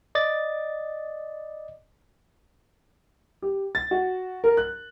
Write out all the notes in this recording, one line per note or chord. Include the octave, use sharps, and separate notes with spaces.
D5 D#5 A6
G4
A6
F#4
A#4
F#6